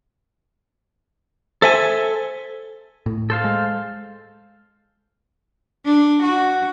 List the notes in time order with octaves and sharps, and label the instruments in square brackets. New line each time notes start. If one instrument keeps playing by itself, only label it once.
[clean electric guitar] A4 E5 G#5 [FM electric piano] C5
[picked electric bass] A2
[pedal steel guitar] A4 C5 F5
[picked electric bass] G#3
[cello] D4
F#4